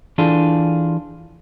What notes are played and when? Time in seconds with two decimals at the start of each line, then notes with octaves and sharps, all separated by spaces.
0.18 E3 D4 F4 G#4 A4